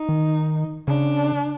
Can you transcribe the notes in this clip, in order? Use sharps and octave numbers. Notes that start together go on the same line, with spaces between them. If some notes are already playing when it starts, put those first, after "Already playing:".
Already playing: D#4
D#3
C#3 D4